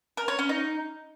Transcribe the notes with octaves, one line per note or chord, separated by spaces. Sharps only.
A#4
C#5
C#4
D#4